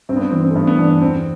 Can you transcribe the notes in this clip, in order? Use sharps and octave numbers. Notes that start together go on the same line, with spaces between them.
G2 C4
B3
C4
E3 C4
C4
A3
G2 B3
B3
E3 D4
D4
E2 C4